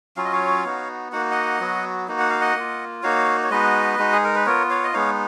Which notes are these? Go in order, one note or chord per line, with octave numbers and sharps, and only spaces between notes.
F#3 C#4 F4 F5
D#5
C#5 F5
B3 D#4 F#4
A#3 D#4 F#4 F#5
D#5 F#5
F#3 B3 F#4
A#3 D#4 F#4
F#5
F5
D#5 F#5
A#3 F4
A#3 D#4 F#4 C#5 F5
C#5
G#3 B3 D#4 F#4 B4 D#5
G#3 D#4 F#4
G#4
A#4
B4
B3 F4 A#4 C#5
C#5 F5
D#5
G#3 B3 D#4 C#5 F5